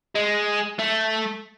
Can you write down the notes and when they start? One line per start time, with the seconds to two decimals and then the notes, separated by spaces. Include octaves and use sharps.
0.15 G#3
0.79 A3